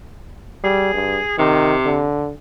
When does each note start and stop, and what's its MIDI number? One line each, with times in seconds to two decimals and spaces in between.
0.64 0.92 55
0.64 1.36 68
0.94 1.21 43
1.39 2.03 48
1.39 1.75 51
1.85 2.33 50